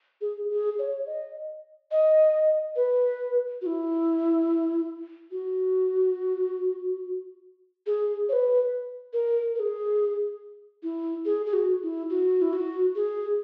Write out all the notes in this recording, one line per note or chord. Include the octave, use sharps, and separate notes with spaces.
G#4
G#4
C#5
D#5
D#5
B4
F#4
E4
F#4
G#4
C#5
B4
A#4
A#4
G#4
E4
G#4
G#4
F#4
E4
F#4
E4
F#4
G#4